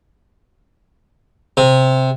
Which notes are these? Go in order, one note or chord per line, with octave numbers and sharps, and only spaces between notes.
C3